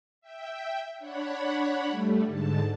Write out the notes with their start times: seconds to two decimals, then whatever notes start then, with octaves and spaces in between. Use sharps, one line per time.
0.21 E5 G5
0.99 D4 C#5 F#5 B5
1.86 G3 A3
2.25 G#2 D3 A5